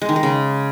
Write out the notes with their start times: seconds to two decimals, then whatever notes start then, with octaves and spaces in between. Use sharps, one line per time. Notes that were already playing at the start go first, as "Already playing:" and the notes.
0.02 G#3
0.09 D#3
0.16 G#3
0.23 C#3